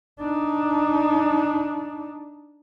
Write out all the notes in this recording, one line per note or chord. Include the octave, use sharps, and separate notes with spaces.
D4 D#4